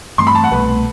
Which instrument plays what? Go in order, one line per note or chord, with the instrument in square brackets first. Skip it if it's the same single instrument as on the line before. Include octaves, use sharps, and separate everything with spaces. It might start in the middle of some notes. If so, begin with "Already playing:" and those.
[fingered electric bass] G2 E3 A3 C4 [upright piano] C6
[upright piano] B5
A5
F#5
[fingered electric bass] C2 B2 A3 [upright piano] B4